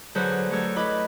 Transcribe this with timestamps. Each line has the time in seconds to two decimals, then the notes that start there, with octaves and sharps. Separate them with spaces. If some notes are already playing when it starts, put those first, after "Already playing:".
0.15 D3 F#3 G#4 B4 C5
0.51 F#3 A3 G4 A4 C#5
0.76 E4 B4 D#5 B5 D6